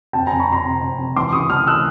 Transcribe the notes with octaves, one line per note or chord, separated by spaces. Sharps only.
F2 G5 A5
F2 G#5 A#5
B5 C#6
F2 A#5 C6
C3
F2
C3
E3 C6 D6
C#2 C#6 D#6
E3 D#6 F6
A3 E6 F#6